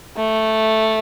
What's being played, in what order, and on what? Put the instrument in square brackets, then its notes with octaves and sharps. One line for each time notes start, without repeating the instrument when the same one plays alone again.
[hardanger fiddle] A3